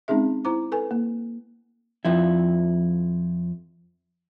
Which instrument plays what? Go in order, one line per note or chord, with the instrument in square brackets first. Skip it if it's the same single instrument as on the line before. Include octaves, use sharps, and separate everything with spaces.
[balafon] G#3 C4 C#4 D#4 G#4 E5
E4 C5 A#5 D6
A4 B4 G#5
A#3
[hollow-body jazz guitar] F2 F3 E4